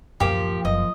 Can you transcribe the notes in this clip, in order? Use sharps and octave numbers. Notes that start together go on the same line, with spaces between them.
D1 F#2 F3 A#3 G4
F#1 D#5